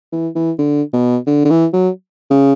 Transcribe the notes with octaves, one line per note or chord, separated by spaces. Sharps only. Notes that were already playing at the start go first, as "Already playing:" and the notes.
E3
E3
D3
B2
D3
D3
E3
F#3
C#3